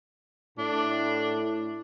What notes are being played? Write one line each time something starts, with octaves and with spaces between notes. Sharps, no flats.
A2 D4